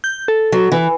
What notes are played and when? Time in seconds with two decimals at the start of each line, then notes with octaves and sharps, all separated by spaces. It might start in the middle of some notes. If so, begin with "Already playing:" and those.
0.04 G6
0.28 A4
0.52 F#3
0.72 E3